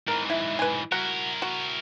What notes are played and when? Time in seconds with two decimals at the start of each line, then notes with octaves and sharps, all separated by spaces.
0.08 G#2 E3 A#4
0.30 E4
0.59 B4 G#5
0.92 E4 F#4 A#4 F#5
1.42 F#4